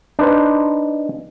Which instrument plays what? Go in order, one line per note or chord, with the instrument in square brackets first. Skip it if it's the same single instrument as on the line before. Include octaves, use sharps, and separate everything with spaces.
[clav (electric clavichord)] D4 D#4 B4 C5